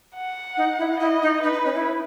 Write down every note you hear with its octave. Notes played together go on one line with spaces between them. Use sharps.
F#5
D#4
E4
E4 D#5
D#4
D#4 B4
D#4
C#4
E4